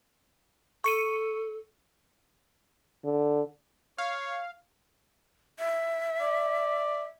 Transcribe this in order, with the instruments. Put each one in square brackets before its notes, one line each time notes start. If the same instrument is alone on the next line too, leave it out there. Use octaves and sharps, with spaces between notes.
[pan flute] A4 [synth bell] C#6 C#7 D#7
[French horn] D3
[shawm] C#5 [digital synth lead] F5
[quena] E5
[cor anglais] D5